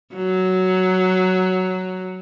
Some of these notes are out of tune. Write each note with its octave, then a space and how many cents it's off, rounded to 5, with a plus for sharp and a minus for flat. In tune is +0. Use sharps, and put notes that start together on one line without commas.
F#3 +5